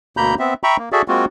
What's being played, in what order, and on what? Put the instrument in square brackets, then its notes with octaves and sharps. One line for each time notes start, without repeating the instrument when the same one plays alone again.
[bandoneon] D2 B2 A#3 A#5 B5 G6
B3 C4 E5
E5 G5 A#5 B5 C#6
A#3
F#4 G#4 A4 D5 E5
G#3 A#3 C4 F4 F#4